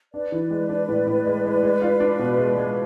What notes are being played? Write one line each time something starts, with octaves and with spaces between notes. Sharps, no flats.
D4 B4 D5
E3
G#3
D4
A2
A2
G#3
G#3
G#3
F4
D4
B2
G#3
G#3